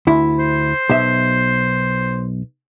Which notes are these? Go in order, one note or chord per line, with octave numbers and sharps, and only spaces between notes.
D2 E4
C5
B1 E5